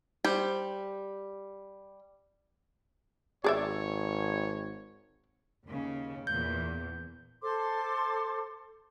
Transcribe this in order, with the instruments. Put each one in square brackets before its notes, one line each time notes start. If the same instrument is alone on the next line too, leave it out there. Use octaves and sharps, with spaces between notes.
[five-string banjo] G3 G4 C5
[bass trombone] G#1 [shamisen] G#4 D5 E5 [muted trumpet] C#5
[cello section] D#2 C#3
[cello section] E2 A#2 [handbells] G6
[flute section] A4 C5 C6 D6